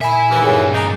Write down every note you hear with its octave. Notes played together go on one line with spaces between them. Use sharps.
A#2 E5 G#5 B5
D#2 E3
G2 F#4 G#4 C#5
A#3 D4 D#4